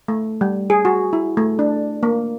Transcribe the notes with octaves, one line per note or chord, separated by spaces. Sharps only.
A3
G3
G#4
F#4
E4
A3
D4
A#3